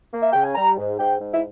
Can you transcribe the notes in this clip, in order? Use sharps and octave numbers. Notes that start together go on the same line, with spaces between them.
A#3
E5
C#3 G5
G#5
G3 A#5
G#2
G#2 G5
G#2
E4